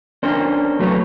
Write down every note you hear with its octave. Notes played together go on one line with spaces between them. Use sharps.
C#4 D4 A#4 C5
F#3 A3 B4 C#5